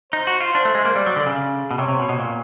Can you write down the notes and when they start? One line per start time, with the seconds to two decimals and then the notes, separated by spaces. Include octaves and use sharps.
0.13 D#4 C5
0.27 F#4
0.40 F4
0.54 D4 C5
0.65 A3
0.75 G#3
0.85 A#3
0.95 G3 D5
1.06 F#3
1.16 D3
1.26 C#3
1.71 B2
1.78 C3 C#5
1.88 C3
1.99 B2
2.09 B2
2.19 A#2